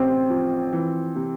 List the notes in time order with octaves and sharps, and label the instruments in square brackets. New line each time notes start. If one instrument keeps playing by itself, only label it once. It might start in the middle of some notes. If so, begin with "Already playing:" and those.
Already playing: [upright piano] A1 [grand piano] C4
[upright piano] F3
E3
C3